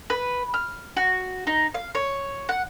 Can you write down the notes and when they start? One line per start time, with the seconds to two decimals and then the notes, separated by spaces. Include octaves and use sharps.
0.10 B4
0.54 F6
0.97 F#4
1.47 D#4
1.74 F5
1.95 C#5
2.49 F#5